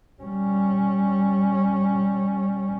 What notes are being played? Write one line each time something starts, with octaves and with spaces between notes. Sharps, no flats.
G3 C#4